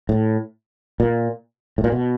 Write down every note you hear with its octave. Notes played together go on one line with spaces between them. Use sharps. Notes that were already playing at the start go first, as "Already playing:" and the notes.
A2
A#2
A2
A#2
B2